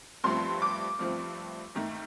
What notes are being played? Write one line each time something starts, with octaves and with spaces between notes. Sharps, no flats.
G2 F3 A3 C4 C6
D6
G2 F3 A3 C4
D#2 D#3 A3